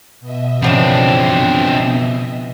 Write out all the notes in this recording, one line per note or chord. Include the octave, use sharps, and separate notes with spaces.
B2 D#5 E5
C#3 F3 B3 C4 D4